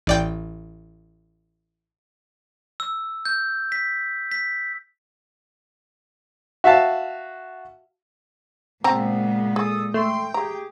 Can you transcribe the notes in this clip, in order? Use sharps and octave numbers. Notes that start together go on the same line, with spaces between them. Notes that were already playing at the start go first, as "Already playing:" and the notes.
A1 D5 G5
E6
G6
B6
B6
F#4 E5 F5 A5
A#2 C#3 G#3 B3 C4 A5 A#5
G#4 A4 D#6
A3 G5 C6
G4 G#4 A#5